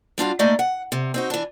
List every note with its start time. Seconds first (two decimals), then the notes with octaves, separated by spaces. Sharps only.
0.18 G3 D4 F4 F#4
0.39 A3 A#3 D#4 D5 D#5
0.59 F#5
0.92 C3
1.14 C4 D#4 F#4
1.30 E3 D4